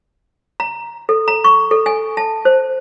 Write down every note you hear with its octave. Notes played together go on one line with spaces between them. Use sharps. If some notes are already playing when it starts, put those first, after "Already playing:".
A#5
A4
A#5
C#6
A4
G#5
A5
C5